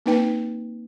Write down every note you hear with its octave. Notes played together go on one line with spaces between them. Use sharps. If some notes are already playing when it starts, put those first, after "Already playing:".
A#3 C4 D#4 B4 G5